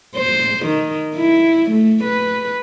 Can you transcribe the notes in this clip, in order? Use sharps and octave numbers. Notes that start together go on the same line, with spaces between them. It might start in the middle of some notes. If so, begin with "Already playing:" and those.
C5
D#3
E4
A3
B4